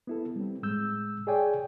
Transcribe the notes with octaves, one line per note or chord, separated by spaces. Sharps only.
B3 E4 A4
G3 C4
A2 G#3 E6 G6
G#4 C#5 D5 G5 G#5